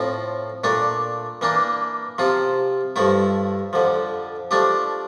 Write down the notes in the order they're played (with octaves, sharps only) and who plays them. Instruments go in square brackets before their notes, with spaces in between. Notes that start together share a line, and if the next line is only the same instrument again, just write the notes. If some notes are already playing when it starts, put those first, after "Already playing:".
Already playing: [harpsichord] A2 F3 C4
A#2 A3 D4
E3 A#3 D4
C3 F3 C4 F4
G2 F3 A3 E4
F2 D3 F3
F3 A3 D4 G4